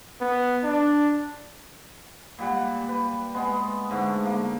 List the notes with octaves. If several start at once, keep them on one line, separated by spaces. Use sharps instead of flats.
B3
D4
A#2 G3 F#5
B4
G#3 B3
G#2 D3 A3
A#3